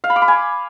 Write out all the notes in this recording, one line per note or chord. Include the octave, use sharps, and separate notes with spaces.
F5
B5
D6
B5
G#5